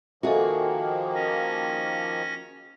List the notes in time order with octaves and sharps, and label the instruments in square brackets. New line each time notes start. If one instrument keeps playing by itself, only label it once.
[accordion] D#3 F3 A#3 [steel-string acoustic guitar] F#4 G#4 [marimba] A4 D#5 E5
[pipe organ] C#4 A#6